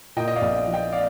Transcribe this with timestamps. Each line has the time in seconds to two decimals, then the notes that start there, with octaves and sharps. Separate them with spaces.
0.16 A#2 D#5 G5
0.28 D#5
0.36 D5 F5
0.42 A#1
0.67 F3
0.73 D#5 G5
0.92 D5 F5